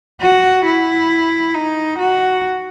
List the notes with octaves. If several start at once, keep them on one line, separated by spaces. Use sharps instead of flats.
F#4
E4
D#4
F#4